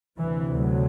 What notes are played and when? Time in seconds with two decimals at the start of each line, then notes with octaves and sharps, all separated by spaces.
0.19 D2 C3 E3
0.57 F#3